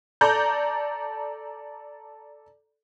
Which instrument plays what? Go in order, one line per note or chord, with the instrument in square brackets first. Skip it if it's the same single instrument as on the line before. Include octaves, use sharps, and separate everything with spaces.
[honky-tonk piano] A4 D5 A#5 G6